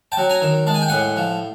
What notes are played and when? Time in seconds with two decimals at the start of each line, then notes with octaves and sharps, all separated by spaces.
0.12 G5 A5
0.17 F#3
0.29 G#5 A#5
0.42 D#3
0.67 G#3 A5
0.74 G#5
0.82 G5
0.88 A2 F#5 G#5
1.16 F3